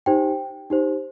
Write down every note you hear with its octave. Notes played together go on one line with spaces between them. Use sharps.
D#4 G4 C5 G5
D#4 G4 C5